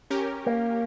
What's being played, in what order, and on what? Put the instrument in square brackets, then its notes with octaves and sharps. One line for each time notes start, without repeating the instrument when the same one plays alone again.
[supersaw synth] C#4 G4 A#4
[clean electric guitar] A#3